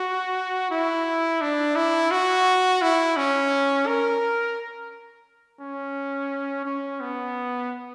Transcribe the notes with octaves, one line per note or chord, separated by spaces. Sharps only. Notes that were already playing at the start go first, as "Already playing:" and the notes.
Already playing: F#4
E4
D4
E4
F#4
E4
C#4
A#4
C#4
C#4
B3